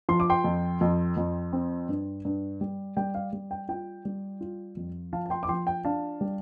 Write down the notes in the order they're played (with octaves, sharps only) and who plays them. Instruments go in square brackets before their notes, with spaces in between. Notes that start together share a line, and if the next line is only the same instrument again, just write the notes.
[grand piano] F3 C6
D6
G5 C6
F2
F2
F2
C4
G2
G2
G3
G3 G5
F5
G3
G5
F4 G5
G3
F4
F2
F3 F5 A5
A5
G5 C6
D6
F3 G5 C6
G5
D4 F5 A5
G3